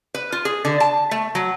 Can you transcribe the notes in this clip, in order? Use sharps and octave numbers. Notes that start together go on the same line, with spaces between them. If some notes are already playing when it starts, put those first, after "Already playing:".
B4
F4
G#4
D3
A5
A3
F#3